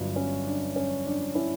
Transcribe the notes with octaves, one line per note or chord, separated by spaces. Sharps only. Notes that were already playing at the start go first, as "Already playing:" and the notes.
Already playing: G1 G2 F#3
C#4
D4
C#4
D4
C#4 E4